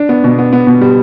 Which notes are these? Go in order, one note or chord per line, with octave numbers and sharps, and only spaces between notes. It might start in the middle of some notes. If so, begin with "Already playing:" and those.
Already playing: D4
B3
B2
B3
B3
B2
G3